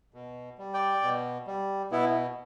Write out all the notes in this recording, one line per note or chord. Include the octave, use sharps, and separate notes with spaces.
B2
G3
D5 G5
B2
G3
B2 B3 E4